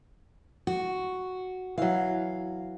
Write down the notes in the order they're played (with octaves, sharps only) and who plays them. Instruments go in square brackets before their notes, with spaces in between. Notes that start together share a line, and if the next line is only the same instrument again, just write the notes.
[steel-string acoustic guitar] F#4
[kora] E3 F#3 [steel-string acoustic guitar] F5